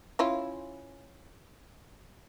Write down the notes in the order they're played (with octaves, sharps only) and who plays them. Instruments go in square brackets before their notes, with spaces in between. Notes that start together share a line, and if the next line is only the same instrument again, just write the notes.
[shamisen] C#4 E4 F4